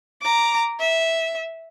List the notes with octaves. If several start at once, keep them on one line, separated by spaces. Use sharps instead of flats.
A#5 D6
E5